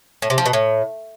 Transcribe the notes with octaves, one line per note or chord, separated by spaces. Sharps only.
A2
C3
F3
B2
A2